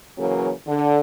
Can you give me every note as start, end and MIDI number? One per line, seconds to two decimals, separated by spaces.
0.18 0.51 49
0.18 0.51 52
0.18 0.51 54
0.18 0.51 58
0.66 0.99 50